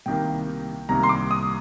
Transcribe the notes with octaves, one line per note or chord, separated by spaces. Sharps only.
C2 C3 D#3 G3 A#3 G5
C2 C3 D#3 G3 A#3 A#5
C6
D6
D#6